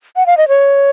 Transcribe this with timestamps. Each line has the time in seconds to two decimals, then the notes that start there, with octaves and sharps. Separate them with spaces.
0.16 F#5
0.26 F5
0.37 D#5
0.48 C#5